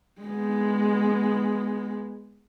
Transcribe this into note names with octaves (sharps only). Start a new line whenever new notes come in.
G#3 B3